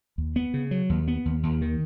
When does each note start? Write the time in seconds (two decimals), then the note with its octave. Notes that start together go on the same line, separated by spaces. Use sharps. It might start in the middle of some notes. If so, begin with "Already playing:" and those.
0.18 D#2
0.36 B3
0.54 C#3
0.71 F#3
0.90 D#2
1.08 B3
1.25 D#2
1.43 D#2
1.61 D#3